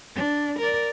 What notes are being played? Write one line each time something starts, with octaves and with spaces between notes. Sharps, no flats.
D4
A#4 D5